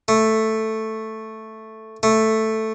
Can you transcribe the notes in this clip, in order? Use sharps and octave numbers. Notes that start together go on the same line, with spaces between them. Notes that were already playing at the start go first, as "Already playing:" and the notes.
A3
A3